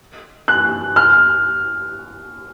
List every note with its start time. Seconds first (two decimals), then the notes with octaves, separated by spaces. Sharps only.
0.48 F#6
0.96 F6